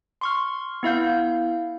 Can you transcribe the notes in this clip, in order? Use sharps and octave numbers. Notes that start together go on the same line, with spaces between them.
C6 C#6 F6
B3 E4 F5 G6